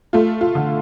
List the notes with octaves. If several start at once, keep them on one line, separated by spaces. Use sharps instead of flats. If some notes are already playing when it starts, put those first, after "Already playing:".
A3 F4
F4
D3